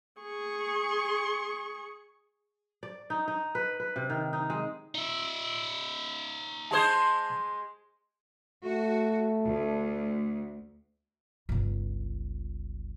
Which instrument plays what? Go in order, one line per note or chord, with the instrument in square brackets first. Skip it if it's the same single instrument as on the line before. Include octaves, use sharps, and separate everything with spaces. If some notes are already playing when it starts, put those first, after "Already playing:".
[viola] G#4 C#6
[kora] D5
D#4
D#4
B4
B4
C3
D#3
D#4
G#3
[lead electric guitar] D#4 E5
[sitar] G#3 G#4 C5 [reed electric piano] A5 C6 G#6
[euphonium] A3 [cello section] F#4
[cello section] D2
[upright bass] G1 C#2